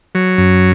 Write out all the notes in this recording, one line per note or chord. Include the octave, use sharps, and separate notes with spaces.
F#3
F#2